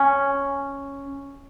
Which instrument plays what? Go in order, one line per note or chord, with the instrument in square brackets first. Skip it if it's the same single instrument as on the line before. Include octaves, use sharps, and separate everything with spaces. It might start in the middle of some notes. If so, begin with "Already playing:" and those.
Already playing: [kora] C#4